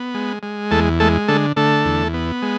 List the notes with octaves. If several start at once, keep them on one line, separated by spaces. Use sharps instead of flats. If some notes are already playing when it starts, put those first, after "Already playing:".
Already playing: B3
G#3
G#3
E2 A3 A4
G#3 A3 A4
D3 A3 A4
D3 A3 A4
E2
B3
G#3